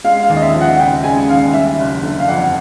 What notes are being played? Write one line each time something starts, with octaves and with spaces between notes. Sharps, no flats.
G#3 F5
F5
D#2
D#5
E5
F3
F#5
C#3 G5
G#3 G#5
D#2 F5
G3 E5
F#1
D3
F5
F2 F#5